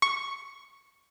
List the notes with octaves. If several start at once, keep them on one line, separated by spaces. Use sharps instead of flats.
C#6